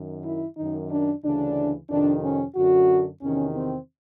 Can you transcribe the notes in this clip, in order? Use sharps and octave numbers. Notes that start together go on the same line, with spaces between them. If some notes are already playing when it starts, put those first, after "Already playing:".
Already playing: F#2 D#3
E4
F#2 D#3 D#4
D4
D2 C#3 E3 D4
F2 C3 D#3 D4
C#4
F#2 D3 F#4
E2 C3 D#3 C#4
C4